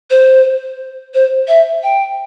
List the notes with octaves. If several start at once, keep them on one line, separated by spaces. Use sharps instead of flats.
C5
C5
E5
G5